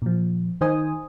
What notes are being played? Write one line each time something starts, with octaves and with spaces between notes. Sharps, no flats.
A#2 F3
D#3 D#4 C5 G#5 D#6